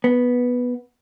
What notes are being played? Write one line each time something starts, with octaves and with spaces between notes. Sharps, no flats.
B3